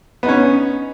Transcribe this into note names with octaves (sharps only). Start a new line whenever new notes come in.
B3 C#4 D#4